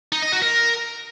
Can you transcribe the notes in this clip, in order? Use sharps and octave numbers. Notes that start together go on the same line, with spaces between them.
D#4
D#5
F#4
A#4